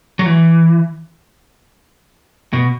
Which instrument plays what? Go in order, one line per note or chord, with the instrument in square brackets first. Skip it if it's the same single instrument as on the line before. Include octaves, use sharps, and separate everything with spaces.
[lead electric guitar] F#3
E3
B2